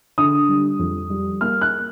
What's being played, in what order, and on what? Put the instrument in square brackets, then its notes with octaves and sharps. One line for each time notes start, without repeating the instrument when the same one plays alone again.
[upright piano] D3 D#6
G3
F2
G3
A#3 F6
F#6